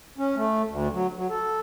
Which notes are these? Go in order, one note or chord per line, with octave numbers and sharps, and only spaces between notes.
C#4
A3
D2
F#3
F#3
A4